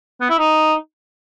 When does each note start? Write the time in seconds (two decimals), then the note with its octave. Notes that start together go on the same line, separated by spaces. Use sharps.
0.21 B3
0.30 E4
0.39 D#4